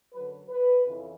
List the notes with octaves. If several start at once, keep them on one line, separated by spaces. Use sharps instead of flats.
F#2 D3 F#3 B4
B4
F2 C#3 E3